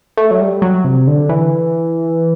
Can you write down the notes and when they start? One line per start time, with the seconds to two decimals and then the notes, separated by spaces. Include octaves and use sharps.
0.17 A3
0.31 F#3
0.40 G3
0.62 F#3
0.84 C3
1.07 D3
1.29 E3